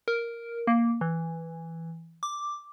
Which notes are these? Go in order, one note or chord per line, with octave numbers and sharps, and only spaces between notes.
A#4
A#3
E3
D6